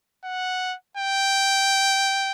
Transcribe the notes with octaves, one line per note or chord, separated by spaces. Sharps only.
F#5
G5